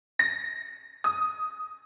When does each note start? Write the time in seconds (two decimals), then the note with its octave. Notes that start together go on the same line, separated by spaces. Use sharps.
0.19 A#6
1.04 D#6